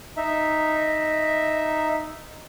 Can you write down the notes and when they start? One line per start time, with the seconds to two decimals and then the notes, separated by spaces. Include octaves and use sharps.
0.17 D#4 E5